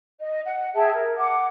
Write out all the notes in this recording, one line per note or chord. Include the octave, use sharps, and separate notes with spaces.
D#5
F#5
G#4 E5 G5 A5
A#4
F#5 D6